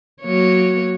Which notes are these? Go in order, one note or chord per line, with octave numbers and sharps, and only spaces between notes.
F#3 A#3 C#5